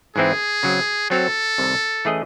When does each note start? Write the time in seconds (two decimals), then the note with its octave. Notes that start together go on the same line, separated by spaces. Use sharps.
0.16 G#2 E3 C4 E4 G#4
0.63 C#3 F#3 C4
1.10 F#3 C4 F#4 A4 C#5
1.58 C2 C3 D#3
2.05 E3 A3 C#4 G#4 D#5